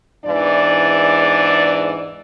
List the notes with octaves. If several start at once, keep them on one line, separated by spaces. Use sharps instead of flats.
E2 G#2 E3 D4 D5